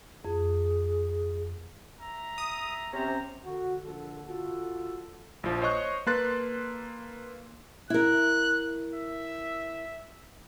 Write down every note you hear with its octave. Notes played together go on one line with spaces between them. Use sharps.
F2 G#4
E5 A#5
D#6
C3 C#4 C5 A#5
D3 F#4
A#1 A4
F4 F#4 A4
A#1 F3
C5 C#5 D#5 C#6 F#6
A#3 A4 B4 C6 F#6 A6
E4 A#4 F#6
E5